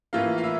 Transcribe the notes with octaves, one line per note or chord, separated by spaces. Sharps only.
A2 E3 A#3 F4 F5
F5
E4 E5